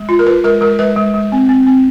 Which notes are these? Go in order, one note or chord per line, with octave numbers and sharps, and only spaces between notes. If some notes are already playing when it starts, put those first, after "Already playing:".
Already playing: G#3
F4
A#4
F4 B4
G#3 A#4
G#3 A#4
G#3 B4
G#3
G#3
C4
C4
C4